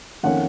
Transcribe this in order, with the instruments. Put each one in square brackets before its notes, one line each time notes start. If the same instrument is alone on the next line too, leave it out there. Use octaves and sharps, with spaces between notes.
[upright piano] F2 D#3 A#3 C#4 F#5